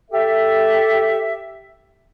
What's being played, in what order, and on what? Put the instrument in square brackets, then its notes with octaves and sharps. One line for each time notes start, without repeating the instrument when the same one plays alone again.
[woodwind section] G4 A4 E5